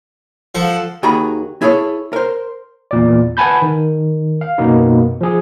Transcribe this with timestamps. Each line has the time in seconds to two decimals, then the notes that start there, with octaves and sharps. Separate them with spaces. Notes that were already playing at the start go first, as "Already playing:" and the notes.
0.55 F3 A4 C5 F#5
1.03 D#2 D#3 F#4 G#4 A#5 B5
1.62 E4 G#4 A4 C#5
2.13 A#4 C5
2.91 E2 A#2 D5
3.37 B4 F#5 G#5 A5 B5 G6
3.62 D#3
4.41 F5
4.58 F#2 B2 A#3 B3 D#4
5.21 F3 G#4